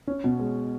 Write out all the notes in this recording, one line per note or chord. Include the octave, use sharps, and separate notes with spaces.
C#4
B2
G#3